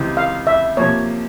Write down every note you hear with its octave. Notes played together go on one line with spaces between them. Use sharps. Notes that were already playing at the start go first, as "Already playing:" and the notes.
Already playing: C#2 C3 E3
F5
E5
C3 F3 A#3 C#5